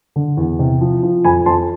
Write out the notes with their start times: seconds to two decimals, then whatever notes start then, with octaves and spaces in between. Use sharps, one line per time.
0.16 D3
0.37 E2
0.59 C3
0.81 F3
1.03 F3
1.25 F2 G#5 B5
1.46 F2 A5 C6